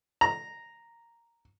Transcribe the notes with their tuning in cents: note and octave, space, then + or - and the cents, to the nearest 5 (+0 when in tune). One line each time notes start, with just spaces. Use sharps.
A#5 -5